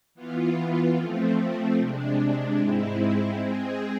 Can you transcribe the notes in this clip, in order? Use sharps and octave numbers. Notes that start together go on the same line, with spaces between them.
E3 B3 F4
F3 A3 C4
C3 G#3 D4
G#2 G#3 C4 E4
G#3 C4 G#4